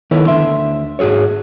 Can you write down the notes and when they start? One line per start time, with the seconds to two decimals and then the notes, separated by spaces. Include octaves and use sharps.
0.11 D#3 B3 E4 A4 C#5
0.27 D2 D3 D#3 E5 C6
0.99 G#2 F#4 G#4 A4 C#5